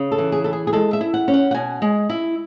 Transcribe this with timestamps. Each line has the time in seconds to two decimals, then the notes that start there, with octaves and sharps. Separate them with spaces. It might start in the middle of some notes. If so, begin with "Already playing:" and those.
Already playing: C#3
0.12 A4
0.18 E3
0.32 G#4
0.44 E4 A4
0.53 G#4
0.67 G#4
0.73 G#3 A4
0.93 E5
1.01 E4
1.14 F#5
1.28 C#4
1.34 F#5
1.51 F#5
1.54 B2 G#5
1.82 G#3
2.09 E4